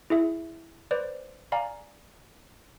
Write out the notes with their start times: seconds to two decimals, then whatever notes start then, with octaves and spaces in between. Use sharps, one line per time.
0.10 E4 G#4 E5
0.91 B4 C5 D5
1.52 D5 F5 G#5 A#5